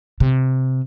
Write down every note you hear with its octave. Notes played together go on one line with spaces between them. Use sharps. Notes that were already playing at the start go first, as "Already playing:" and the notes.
C3